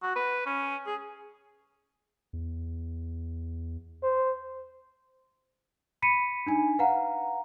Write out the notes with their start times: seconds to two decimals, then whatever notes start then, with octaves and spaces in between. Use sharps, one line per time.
0.03 F#4
0.16 B4
0.46 C#4
0.86 G#4
2.33 E2
4.03 C5
6.02 B5 B6 C#7 D#7
6.46 D4 D#4 G#5
6.79 B4 F5 F#5 A#5